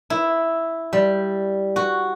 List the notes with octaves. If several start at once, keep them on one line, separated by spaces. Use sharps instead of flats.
E4
G3
F#4